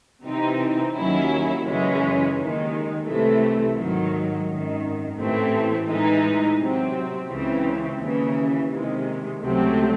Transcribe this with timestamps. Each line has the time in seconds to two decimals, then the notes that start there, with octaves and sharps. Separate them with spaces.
0.23 C3 E3 C4 D#4
0.94 D#2 D#3 F#3 C#4 E4
1.65 F#2 C#3 E3 G#3 C#4
2.35 D#2 D#3 G#3
3.06 C2 C3 E3 A3
3.76 G#2 D#3 F#3
4.47 G#1 F#2 D#3
5.17 A1 A2 E3 A3 C4
5.88 A2 E3 G#3 D#4
6.58 C3 F#3 C4
7.29 C#2 C#3 E3 C4
8.00 D#2 C#3 E3
8.70 C3 D#3 G#3
9.41 C#2 C3 F#3 A3 C4